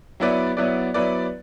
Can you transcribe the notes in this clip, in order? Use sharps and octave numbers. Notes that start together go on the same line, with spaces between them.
F#3 B3 E4 B4 D5
F#3 B3 E4 B4 D5
F#3 B3 E4 B4 D5